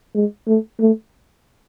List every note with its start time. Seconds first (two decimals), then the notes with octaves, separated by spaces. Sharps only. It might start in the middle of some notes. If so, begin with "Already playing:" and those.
0.15 G#3
0.47 A3
0.80 A3